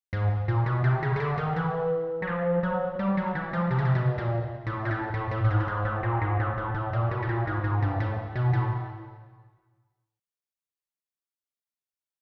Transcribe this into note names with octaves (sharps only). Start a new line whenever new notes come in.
G#2
A#2
B2
C3
C#3
C#3
D3
D#3
E3
F#3
F3
F#3
G3
F#3
E3
F3
C3
C#3
C3
B2
A#2
A2
A#2
A2
A2
A2
A2
G#2
A2
G#2
A2
A#2
G#2
A2
A2
A2
A#2
B2
A2
A#2
G#2
G#2
G2
A2
B2
A2